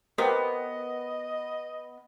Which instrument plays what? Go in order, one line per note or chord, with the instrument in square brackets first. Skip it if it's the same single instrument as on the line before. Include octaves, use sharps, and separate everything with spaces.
[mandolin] B3 [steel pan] G4 A#4 C5 [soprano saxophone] D#5